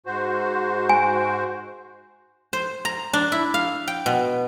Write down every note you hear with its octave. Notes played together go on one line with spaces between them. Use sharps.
G#2 F#4 C5
G#5
C5
A#5
D4
E4
F5
G5
B2